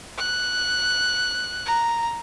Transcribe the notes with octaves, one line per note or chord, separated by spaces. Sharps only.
F#6
A#5